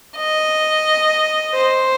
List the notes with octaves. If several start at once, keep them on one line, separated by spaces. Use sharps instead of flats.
D#5
C5